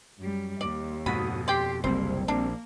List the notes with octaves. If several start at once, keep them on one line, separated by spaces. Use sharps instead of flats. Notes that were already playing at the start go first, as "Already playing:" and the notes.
F#2 G3
D#2 D5
F2 G#2 B2 F#4 B5 D#6
G4 D5 G5 C6
F#1 C2 G3 A#3 C4 C5
A#1 A#3 D4